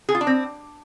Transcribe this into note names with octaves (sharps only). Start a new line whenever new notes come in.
G#4
F4
D4
C4